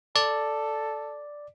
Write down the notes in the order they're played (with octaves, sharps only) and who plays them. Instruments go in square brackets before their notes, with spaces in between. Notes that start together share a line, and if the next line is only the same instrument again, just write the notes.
[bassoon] A4 [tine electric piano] D5